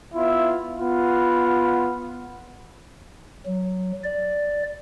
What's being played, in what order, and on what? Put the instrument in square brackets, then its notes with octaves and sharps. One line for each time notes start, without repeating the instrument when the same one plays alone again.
[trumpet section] B3 E4 F4 E5
B3 F4 F#5 B5
[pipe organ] F#3
D5